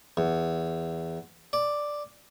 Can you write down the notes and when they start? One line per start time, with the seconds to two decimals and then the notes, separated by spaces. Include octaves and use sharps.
0.17 E2
1.53 D5